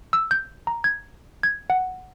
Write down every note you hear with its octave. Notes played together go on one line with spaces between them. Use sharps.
E6
G6
A#5
G#6
G#6
F#5